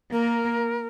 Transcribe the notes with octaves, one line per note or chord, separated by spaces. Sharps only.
A#3 A#4